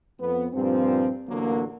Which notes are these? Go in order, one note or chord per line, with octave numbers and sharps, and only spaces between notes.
F2 B3
G2 A#2 F3 C4
A1 D3 F#3 A#3